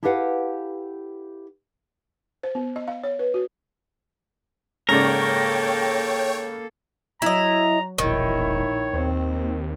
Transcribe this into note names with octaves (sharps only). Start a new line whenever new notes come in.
E4 G4 A4 B4 F5 F#5
C5
B3
D#5
F5
C#5
B4
F#4
G#2 C#3 A#3 A4 A#4 C#5 D5 G5
F#3 E4 D#5 A#5
E1 A#1 D#3 E4 C#5
D#2 C4